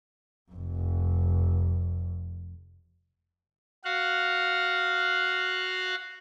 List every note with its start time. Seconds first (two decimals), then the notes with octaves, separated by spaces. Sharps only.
0.52 F1 F2
3.84 F#4 F5 F#5